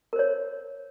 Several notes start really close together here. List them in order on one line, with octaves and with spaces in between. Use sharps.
A#4 C5 C#5